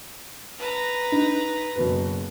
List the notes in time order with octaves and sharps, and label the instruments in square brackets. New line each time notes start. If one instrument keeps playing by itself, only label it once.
[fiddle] B4 A#5
[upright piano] D#4
F#1 B2 B4